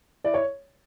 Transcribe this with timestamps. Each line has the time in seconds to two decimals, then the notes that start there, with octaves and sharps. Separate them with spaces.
0.24 E4 D5
0.34 C#5